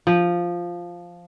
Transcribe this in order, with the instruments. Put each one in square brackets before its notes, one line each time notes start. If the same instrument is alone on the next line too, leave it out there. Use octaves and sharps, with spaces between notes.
[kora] F3